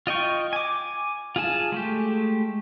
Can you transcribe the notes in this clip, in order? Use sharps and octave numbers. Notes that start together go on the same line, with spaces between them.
F4 D#5 G5 C#6
G#5 D6
F4 G#4 G#5 A5
G#3 A3 G4